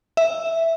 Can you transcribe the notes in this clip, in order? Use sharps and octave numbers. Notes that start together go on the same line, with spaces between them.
E5